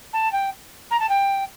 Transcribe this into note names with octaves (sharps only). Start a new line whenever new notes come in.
A5
G5
A#5
A5
G5